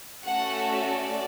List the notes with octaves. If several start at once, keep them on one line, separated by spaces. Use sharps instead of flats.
A3 C#4 F#4 A4 F#5
D5